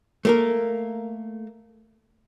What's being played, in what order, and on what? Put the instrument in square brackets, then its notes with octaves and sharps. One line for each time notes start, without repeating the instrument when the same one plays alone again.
[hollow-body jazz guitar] A3 A#3 A#4